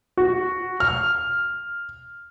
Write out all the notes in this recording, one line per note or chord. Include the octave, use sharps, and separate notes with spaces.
F#4
F6